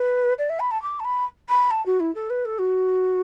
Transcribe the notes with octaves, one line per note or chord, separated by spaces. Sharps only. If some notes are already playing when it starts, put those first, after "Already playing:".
Already playing: B4
D5
E5
B5
A5
D6
A5
B5
B5
A5
F#4
E4
A4
B4
A4
F#4